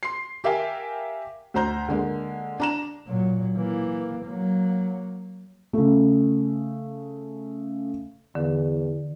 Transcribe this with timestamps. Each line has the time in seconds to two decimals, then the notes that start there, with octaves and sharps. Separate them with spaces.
0.03 C6 C7
0.44 G4 A#4 E5 F5 G5 G#5
1.54 D2 C5 A#5 G6
1.88 D3 G#3 A#3
2.60 D4 A#5 E7
3.08 A#2 F#3
3.57 E3 A#3
4.26 F#3 A#3
5.73 C#3 A3
8.35 E2 D3